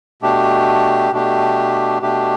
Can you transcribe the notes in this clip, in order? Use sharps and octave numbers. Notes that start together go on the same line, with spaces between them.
B2 A3 D4 G4
B2 A3 D4 G4
B2 A3 D4 G4